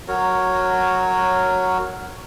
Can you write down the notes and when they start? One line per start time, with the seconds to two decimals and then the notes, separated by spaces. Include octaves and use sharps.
0.08 F#3 F#4 A#4 C#5